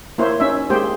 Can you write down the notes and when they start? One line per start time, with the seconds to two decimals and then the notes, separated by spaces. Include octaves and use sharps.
0.18 A#3 E4 C5 C#5
0.40 C#4 D#4 E5
0.70 G#3 A#3 G4 G#4 C5 G5